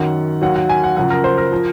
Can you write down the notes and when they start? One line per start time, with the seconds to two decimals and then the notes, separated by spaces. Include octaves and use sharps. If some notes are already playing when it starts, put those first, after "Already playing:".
Already playing: F#2 D#3 F#3 F#5
0.42 D#2 D#3 F#3 F#5
0.56 F#5
0.69 G#5
0.84 F#5
0.97 F#2 C#3 F3 F#5
1.10 A#4
1.24 C5
1.38 A#4
1.52 F3